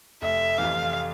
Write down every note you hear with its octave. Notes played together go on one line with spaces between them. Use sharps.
F1 E5
F2 C3 E3 F5